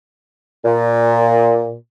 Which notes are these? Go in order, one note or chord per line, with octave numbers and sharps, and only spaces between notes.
A#2